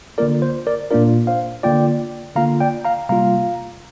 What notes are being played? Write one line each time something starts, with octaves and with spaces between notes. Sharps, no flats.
D3 A#3 F4 A#4 D5
C5
A#4 D5
A#2 A#3 D4 F4 A#4 D5
C5 F5
D3 A#3 F4 D5 G5
D3 A#3 F4 F5 A#5
D5 G5
F5 A#5
C3 G3 A#3 F4 F5 A#5